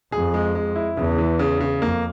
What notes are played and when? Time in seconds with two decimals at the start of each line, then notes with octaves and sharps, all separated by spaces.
0.12 F2 G#4
0.34 G#3
0.55 G#3
0.76 E4
0.97 E2 C#3
1.18 E3
1.39 C#3
1.60 C#3
1.82 F2 A#3